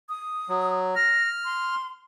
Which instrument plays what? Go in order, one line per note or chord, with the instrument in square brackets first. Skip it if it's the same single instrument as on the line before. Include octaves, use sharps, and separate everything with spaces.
[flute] D#6
[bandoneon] F#3
[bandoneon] F6 [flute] A#6
[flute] C6